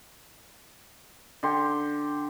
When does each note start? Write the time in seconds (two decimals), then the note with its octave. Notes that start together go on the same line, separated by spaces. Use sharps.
1.43 D3 G4 C6